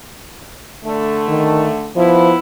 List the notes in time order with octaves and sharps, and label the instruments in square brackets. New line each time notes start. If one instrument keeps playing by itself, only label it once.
[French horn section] D3 A3
[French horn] D#3
[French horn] F3 [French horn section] B3 E4